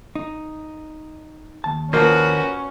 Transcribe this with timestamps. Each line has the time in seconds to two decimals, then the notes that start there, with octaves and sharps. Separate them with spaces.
0.15 D#4
1.64 D#2 A5
1.93 F3 A#3 C#4 F#4 B4